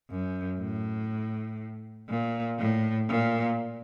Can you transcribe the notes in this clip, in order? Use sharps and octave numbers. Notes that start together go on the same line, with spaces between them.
F#2
A2
A#2
A2
A#2